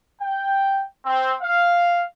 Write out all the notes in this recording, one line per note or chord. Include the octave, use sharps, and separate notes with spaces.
G5
C4
F5